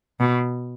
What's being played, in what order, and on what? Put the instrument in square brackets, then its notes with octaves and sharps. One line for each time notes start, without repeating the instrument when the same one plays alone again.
[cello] B2